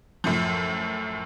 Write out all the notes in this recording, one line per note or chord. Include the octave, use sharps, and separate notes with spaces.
F#2 A2 F3